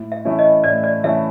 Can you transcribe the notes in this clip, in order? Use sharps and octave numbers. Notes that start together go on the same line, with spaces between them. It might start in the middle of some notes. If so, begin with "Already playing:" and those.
Already playing: A2
E5
E3 A3 C#4 E4
D#5
A2 D5
D5
E3 A3 C#4 E4 E5